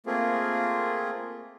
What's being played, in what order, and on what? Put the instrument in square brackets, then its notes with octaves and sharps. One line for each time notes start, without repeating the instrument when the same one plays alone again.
[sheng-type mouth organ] A3 A#3 C4 F4 G#4